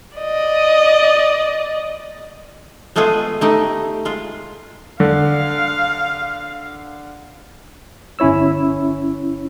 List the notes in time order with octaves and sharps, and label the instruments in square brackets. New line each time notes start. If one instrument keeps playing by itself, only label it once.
[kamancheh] D5 D#5
[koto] G#3 A3 B3 F4 G#4
A3 D#4 G4
G#3 F4
[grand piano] D3 [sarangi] F5
[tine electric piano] G1 C#4 E4 C#5 E6